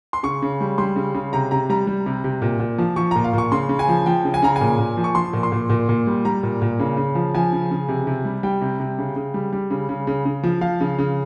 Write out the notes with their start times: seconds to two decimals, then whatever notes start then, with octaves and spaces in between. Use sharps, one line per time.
0.13 C6
0.23 C#3 C#6
0.42 C#3
0.61 G3
0.78 G3 C6
0.96 C#3
1.14 C#3
1.33 C3 A#5
1.51 C3 A#5
1.69 G3 A#5
1.87 G3
2.06 C3
2.24 C3
2.42 A#2
2.60 A#2
2.78 F3
2.96 F3 C#6
3.11 A#2 A#5
3.24 F5
3.33 A#2 C#6
3.52 C#3 C6
3.69 C#3
3.79 G#5
3.89 F3
4.06 F3 G5
4.25 C#3
4.34 G#5
4.42 C#3 A#5
4.56 G#5
4.61 A#2
4.79 A#2
4.97 F3
5.04 C#6
5.15 F3 C6
5.33 A#2
5.43 C6
5.52 A#2
5.70 A#2
5.89 A#2
6.07 G3
6.25 G3 A#5
6.43 A#2
6.62 A#2
6.80 C#3
6.97 C#3
7.15 F3
7.34 F3 G#5
7.52 C#3
7.71 C#3
7.88 C3
8.07 C3
8.25 G3
8.43 G3 G5
8.62 C3
8.80 C3
8.98 C#3
9.16 C#3
9.34 G3
9.53 G3
9.70 C#3
9.89 C#3
10.07 C#3
10.25 C#3
10.43 F3
10.61 F3 F5
10.80 C#3
10.99 C#3